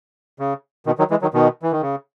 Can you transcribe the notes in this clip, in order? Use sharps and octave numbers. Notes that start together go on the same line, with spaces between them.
C#3
B2 D#3
D#3 F#3
E3 G#3
D#3 F#3
B2 D#3
E3
D#3
C#3